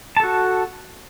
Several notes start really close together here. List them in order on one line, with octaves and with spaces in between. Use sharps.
A5 A4 F#4